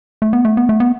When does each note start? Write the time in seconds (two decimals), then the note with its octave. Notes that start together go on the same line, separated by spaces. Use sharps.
0.22 A3
0.33 B3
0.45 A3
0.57 B3
0.69 A3
0.80 B3